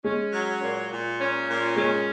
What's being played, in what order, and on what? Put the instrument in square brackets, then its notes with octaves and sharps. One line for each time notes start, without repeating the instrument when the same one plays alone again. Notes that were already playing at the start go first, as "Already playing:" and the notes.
[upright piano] G#3 [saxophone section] C#4
[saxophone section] F#3
A#2
A#2
C#4
A#2
[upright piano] G#3 [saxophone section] C#4